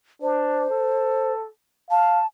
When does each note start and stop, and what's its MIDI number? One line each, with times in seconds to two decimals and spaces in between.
0.22 0.69 62
0.22 1.33 72
0.70 1.47 69
1.91 2.21 77
1.91 2.26 81